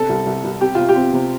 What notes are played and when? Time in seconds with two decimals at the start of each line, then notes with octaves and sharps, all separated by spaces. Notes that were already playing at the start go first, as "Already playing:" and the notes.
Already playing: C3 D4 A4
0.09 C2
0.26 C2
0.44 C2
0.61 C4 G4
0.75 C3 F4
0.89 G4
0.96 C4
1.13 C3